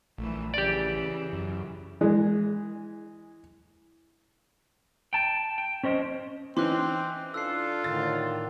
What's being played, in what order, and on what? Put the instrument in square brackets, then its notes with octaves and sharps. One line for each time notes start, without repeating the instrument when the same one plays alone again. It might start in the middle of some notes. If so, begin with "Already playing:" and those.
[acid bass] A#1 [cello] E3 A3
[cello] C#3 E3 [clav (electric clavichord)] G4 D5
[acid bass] F#2
[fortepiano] E3 G#3
[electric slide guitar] G5 A5
G5
C#4 C5 D#5
[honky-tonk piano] E3 C#4 D#4 [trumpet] C4 [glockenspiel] C6 D6 F#6
[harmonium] D4 A4 [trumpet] F4 [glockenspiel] E6 F#6 C7
[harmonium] A2 D3 D#3 [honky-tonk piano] A6